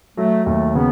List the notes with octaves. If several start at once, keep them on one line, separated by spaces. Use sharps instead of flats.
F#3 A3
D#2 A3
C#3 B3